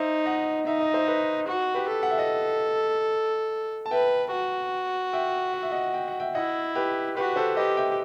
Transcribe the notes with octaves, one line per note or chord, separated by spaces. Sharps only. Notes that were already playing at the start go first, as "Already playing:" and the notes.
Already playing: D#4 C5 E5
D#5 F#5
D#4 E5
D#5
C5 E5
B4 D#5
F#4
G4 B4
A4
F#5
E5
D#5 F#5
A5
B4 E5 G5
F#4
E5 G5
F#5
E5
D#5 F#5
G5
F#5
E5 G5
E4 D#5 F#5
G4 B4
F#4 G4 B4
A4 C5
G4 B4 D#5
E5 G5